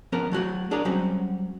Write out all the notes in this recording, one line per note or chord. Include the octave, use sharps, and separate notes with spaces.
F3 B3 C#4 A#4
F#3 A3 F#4 C#5
D4 G#4 A#4 C#5 D5
F#3 G3 C4 C#4 F#4